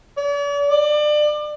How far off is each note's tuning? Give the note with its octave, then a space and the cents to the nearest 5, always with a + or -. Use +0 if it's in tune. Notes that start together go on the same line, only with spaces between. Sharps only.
D5 -45
D5 +30